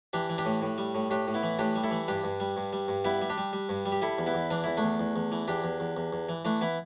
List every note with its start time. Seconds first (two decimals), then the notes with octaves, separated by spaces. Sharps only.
0.13 E3 D4 G4
0.29 E3
0.38 D4 G4
0.45 A2
0.62 A2
0.78 G3
0.95 A2
1.10 A2 D4 G4
1.27 A2
1.34 B3 E4
1.43 E3
1.59 A2 D4 G4
1.76 G3
1.83 E4 A4
1.91 E3
2.08 G2 D4 G4
2.24 G2
2.40 G3
2.57 G2
2.73 G3
2.88 G2
3.05 G3 B3 E4
3.21 G3
3.30 D4 G4
3.38 G3
3.53 G3
3.69 G2
3.86 G3
3.92 G4
4.02 G3 E4 A4
4.18 E2
4.26 B3 E4
4.34 E2
4.51 E3 D4
4.64 E2 E4
4.77 A3 D4
4.83 E2
5.00 E2
5.16 E2
5.32 E3
5.48 E2 D4 G4
5.64 E2
5.80 E2
5.97 E2
6.12 E2
6.29 E3
6.45 E3 A3 D4
6.61 E3 B3 E4